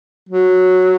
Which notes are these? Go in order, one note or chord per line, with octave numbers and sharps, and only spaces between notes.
F#3